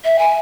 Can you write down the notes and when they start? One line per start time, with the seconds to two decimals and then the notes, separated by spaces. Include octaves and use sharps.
0.05 E5
0.19 G#5